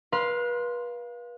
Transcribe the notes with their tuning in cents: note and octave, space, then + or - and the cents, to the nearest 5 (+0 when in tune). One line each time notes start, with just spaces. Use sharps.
B4 -35 F5 +0 C6 +0